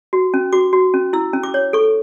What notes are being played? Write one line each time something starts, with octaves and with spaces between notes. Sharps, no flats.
F#4
C#4
F#4 D6
F#4
C#4
E4 E6
C#4
D6
C#5
A4 C#6